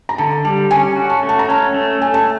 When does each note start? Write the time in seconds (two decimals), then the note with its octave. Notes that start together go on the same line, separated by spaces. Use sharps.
0.09 A#5
0.18 D3 A5
0.45 G3 A5
0.71 C#4 G#5
0.96 F#4
1.10 A5
1.23 A3
1.29 A5
1.39 A#5
1.49 C#4 A5
1.74 A3
2.01 A3 G#5
2.14 A5